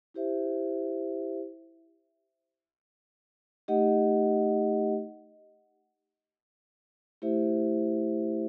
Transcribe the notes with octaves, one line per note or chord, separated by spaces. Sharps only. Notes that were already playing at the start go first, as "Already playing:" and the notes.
E4 G4 C5 E5
A3 D#4 G4 D#5 F#5
A3 E4 G4 C5 E5